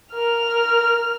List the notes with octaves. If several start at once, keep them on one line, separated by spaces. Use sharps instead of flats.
A#4 F6